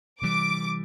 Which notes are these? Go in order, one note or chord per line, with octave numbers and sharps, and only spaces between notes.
C3 E3 G3 D6